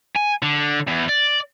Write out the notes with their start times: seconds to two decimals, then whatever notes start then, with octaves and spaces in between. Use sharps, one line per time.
0.16 G#5
0.42 D3
0.87 E2
1.08 D5